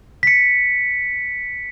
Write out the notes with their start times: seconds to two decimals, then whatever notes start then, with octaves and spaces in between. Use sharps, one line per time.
0.23 B6 C#7